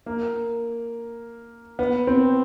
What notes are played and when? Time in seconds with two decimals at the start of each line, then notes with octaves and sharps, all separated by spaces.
0.06 A#3
1.79 B3
2.07 C4